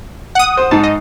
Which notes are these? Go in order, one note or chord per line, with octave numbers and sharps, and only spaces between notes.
F#5 D#6
C5
G#2 D#4 A5
D#5